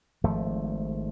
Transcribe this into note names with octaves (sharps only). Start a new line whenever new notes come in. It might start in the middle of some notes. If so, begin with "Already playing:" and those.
G#1 G#2 F3 A3